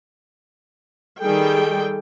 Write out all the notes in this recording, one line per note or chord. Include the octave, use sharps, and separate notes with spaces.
D#3 G3 G#4 A4 G5